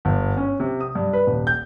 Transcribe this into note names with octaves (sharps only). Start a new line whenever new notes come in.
G1
C#4
C3
D#6
G2
B4
D#1
G6